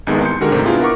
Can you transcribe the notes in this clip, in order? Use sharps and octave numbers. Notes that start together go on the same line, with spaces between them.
C2 G#2 C3 D#3 G#3 B3
C6 G6 C#7
D3 D#3 G#3 F#4 G4 A#4
G#2 C3 G3 A3
B3 D4 E4 F4 G#4
A#4 F#5 C#6 D6